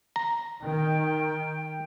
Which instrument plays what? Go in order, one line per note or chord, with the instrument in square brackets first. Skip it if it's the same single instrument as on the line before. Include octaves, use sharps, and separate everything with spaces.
[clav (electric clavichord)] A#5
[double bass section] D#3 [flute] G5